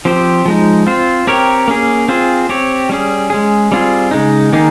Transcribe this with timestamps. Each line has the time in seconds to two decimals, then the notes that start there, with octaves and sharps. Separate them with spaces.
0.05 F3 C4 G4 C5
0.46 F3 G#3 D#4
0.87 C4 F4 C5
1.27 C4 G4 A#4 C#5
1.68 A#3 C#4 G#4
2.08 C4 F4 G#4 C5
2.49 C4 G4 C#5
2.89 G3 C#4 G#4
3.30 G#3 C#4 G#4
3.72 G3 C4 F4 G#4
4.11 C#3 G#3 D#4
4.53 D#3 A#3 D#4 G#4